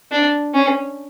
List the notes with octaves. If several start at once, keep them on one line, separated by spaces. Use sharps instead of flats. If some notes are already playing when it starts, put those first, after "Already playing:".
D4
C#4